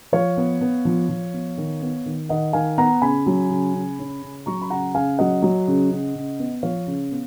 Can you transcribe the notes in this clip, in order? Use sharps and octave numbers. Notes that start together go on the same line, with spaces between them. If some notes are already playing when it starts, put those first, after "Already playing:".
F3 C#5 F5
B3
B3
F3
F3
B3
D#3
B3
D#3
D#3 D#5 F#5
D#3 F5 G#5
B3 F#5 A#5
C#3 G#5 B5
F#3
C#3
C#3
C#4
C#3
F#3 A#5 C#6
B5
C#3 F#5 A#5
C#3 F5 G#5
F#3 D#5 F#5
F#3
C#3
C#3
C#3
B3
F3 C#5 F5
C#3
B3